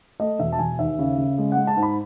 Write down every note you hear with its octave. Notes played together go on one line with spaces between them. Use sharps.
A3 D#5
E1 E5
A5
E1 G#5
D#2 E5
C#3
C#3
G#3
G#3 F#5
A5
G#2
B5